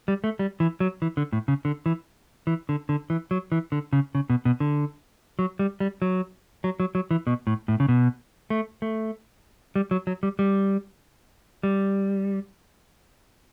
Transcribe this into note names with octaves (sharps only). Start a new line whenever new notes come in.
G3
A3
G3
E3
F#3
E3
D3
A2
C#3
D3
E3
E3
D3
D3
E3
F#3
E3
D3
C#3
C#3
B2
B2
D3
F#3
G3
G3
F#3
F#3
F#3
F#3
E3
B2
A2
A2
C#3
B2
A3
A3
G3
F#3
F#3
G3
G3
G3